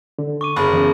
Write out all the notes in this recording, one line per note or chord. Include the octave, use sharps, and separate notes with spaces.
D3
C#6 D6 D#7
F#1 G#4 B5
E2 C#3